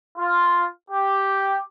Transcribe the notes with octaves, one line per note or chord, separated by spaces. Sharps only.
F4
G4